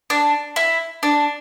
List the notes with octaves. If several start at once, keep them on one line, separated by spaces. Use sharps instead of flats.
D4
E4
D4